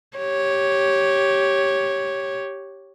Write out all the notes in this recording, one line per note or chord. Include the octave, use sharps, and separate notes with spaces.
G4 C#5